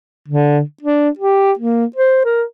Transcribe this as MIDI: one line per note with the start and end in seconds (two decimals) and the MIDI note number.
0.28 0.61 50
0.82 1.09 62
1.19 1.52 67
1.59 1.86 58
1.96 2.23 72
2.25 2.43 70